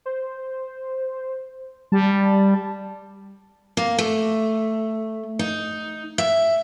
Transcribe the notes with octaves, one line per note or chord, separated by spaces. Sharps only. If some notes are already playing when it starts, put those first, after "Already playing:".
C5
G3 A5
A#3
A3
D#4
E5